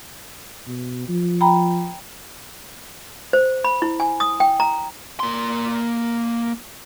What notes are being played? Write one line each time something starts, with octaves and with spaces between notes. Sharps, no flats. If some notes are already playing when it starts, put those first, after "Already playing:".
B2
F3
G5 A#5 B5
C5
B5
E4
G#5
D#6
G5
A#5
A#3 C6